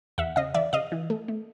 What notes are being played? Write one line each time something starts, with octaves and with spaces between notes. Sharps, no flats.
E2 E5 F#5
C#3 D#5 F5
E3 D5 E5
C#3 D#5 F5
E3
A3
A3